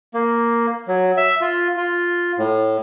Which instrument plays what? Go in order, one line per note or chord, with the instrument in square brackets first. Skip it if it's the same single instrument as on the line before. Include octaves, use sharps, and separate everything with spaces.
[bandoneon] A#3
F#3
E5
F4
F4
A2